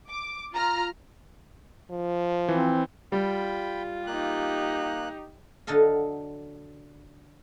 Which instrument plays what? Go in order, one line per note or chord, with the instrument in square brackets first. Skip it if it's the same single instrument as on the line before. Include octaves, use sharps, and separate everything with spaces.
[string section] D6
F4 A#5 F6
[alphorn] F3
[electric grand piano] E3 [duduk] C4
[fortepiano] G3 [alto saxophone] F4 [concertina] G5 B5
[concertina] A#3 F#6 [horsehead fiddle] D#4 G4
[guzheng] D3 F#3 A4 D#5 F5